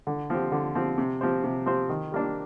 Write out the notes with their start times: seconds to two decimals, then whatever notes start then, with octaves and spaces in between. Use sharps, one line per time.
0.07 D3
0.30 F3 C4 G4
0.52 D3
0.75 F3 C4 G4
0.98 C3
1.21 F3 C4 G4 C5
1.44 C3
1.66 F3 C4 G4 C5
1.89 D#3
2.12 G3 A#3 D4